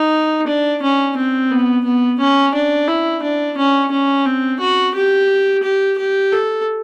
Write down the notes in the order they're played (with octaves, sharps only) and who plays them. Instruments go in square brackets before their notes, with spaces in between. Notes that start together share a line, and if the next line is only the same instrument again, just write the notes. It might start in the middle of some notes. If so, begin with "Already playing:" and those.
Already playing: [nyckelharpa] D#4
D4
C#4
C4
B3
B3
C#4
D4
E4
D4
C#4
C#4
C4
F#4
G4
G4
G4
A4